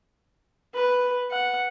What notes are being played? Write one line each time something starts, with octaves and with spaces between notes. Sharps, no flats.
B4
F#5